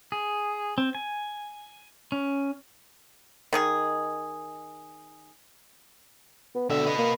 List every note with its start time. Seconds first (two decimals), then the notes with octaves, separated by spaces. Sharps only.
0.12 G#4
0.78 C4
0.95 G#5
2.12 C#4
3.53 D#3 D#4 G#4
6.55 B3
6.70 B2 D3 E5
6.86 B4 D#5
6.98 A#3